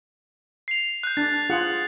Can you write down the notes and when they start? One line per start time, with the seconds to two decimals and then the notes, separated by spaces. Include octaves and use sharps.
0.68 C7 F7
1.03 F#6 G6
1.17 D4 A6
1.50 F4 G#4 F#5